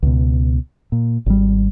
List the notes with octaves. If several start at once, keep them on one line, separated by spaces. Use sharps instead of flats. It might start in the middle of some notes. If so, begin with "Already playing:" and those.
C#2 B2
A#2
G#1 G3